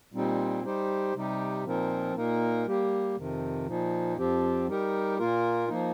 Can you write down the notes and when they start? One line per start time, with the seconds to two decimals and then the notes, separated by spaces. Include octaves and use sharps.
0.13 A#2 G3 C4 D#4
0.64 G3 D#4 G4 C5
1.14 C3 G3 D#4 G4
1.64 A#2 F3 C4 D#4 A#4
2.15 A#2 A#3 D#4 A#4
2.66 G3 A#3 G4
3.16 F2 C3 D#3
3.66 A#2 F3 D#4
4.17 F2 F3 C4 G4
4.68 G3 D#4 G4 A#4
5.18 A#2 A#3 F4 A#4
5.68 F3 A#3 D#4